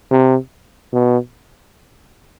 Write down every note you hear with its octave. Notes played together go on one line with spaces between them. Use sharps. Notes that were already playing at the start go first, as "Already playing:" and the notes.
C3
B2